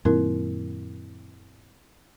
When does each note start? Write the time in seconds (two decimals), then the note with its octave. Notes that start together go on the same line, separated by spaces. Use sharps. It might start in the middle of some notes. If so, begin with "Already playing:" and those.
0.05 F#2 A#2 D#3 C4 E4 A#4